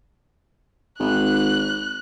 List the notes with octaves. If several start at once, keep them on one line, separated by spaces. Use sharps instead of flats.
G#1 F#6